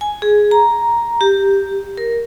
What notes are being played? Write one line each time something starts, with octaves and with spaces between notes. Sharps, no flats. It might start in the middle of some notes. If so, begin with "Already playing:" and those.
G#5
G#4
A#5
G4
A#4